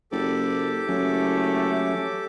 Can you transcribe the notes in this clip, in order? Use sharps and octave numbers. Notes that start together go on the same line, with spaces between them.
F#1 G4 A4 D6
F#1 F#3 A3 C#4